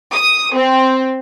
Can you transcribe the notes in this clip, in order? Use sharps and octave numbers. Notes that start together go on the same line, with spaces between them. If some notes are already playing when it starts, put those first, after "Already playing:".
D#6
C4